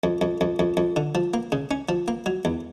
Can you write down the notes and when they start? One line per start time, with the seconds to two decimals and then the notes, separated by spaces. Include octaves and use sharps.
0.04 F2
0.21 F2
0.41 F2
0.59 F2
0.77 F2
0.96 D3
1.15 F3
1.34 A#3
1.52 C#3
1.71 C#4
1.89 F3
2.08 A#3
2.26 F#3
2.45 E2